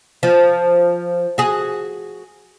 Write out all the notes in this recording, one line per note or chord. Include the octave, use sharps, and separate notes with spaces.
F3
F#4 G#4